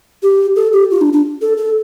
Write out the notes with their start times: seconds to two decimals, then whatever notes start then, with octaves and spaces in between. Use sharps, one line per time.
0.23 G4
0.56 A4
0.73 G4
0.91 F4
1.01 D4
1.13 D4
1.42 A4
1.57 A4